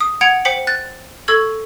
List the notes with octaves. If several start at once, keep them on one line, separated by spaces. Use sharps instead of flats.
D#6
F#5 G#6 C#7 D7 F7
C5 G5 B6 C#7 F#7
F#6 A6
A4 C#6 E6 G#6 F#7